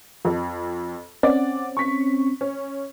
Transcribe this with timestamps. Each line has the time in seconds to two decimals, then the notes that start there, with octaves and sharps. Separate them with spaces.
0.25 F2
1.23 C4 C#4 D5 F#5
1.77 C#6 B6
2.41 C#4